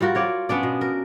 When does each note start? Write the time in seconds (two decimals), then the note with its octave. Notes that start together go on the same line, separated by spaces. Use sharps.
0.01 G3 F4 F#4 A#4
0.15 F4 C#5 D5
0.49 B3 C#4 D4 D5
0.63 B2
0.81 A#4